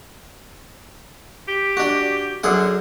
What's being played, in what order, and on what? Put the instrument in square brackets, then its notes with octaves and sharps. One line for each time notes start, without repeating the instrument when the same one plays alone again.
[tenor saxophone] G4
[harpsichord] D4 F#4
[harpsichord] F#2 G#4 F#5 [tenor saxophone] D3